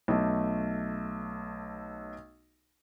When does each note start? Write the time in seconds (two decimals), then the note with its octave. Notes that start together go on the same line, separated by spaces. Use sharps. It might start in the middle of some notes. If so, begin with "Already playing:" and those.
0.08 B1 A3